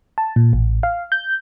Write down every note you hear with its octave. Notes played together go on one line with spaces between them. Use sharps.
A5
A#2
A1
F5
G6